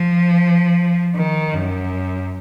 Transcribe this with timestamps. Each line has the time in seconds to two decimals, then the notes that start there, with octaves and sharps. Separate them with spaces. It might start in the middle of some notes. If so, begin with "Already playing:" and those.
Already playing: F3
1.16 D#3
1.53 F#2